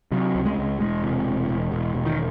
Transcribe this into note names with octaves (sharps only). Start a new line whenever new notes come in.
C3 F#3
C#2
G#3
C#2
E1 G#3
C3
E1
E1
E1
E1
D#3